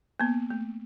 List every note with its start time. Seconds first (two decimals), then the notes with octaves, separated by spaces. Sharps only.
0.20 A#3 B3
0.50 A3